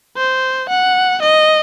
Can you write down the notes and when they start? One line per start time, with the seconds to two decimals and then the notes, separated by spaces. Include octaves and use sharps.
0.17 C5
0.69 F#5
1.22 D#5